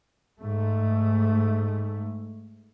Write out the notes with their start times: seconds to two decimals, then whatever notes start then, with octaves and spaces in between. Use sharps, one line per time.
0.40 G#2 A3